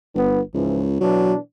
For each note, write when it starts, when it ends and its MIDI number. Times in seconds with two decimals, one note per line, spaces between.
0.15 0.41 31
0.15 0.39 59
0.54 1.00 37
0.54 0.83 44
0.54 0.83 52
0.54 0.83 53
1.00 1.36 47
1.00 1.36 52
1.00 1.33 54
1.00 1.36 62